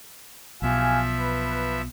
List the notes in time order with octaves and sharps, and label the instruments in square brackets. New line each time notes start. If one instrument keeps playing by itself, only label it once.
[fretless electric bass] B1 B2 [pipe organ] F3 E5 [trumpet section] G4 F5 G#5
[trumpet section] B4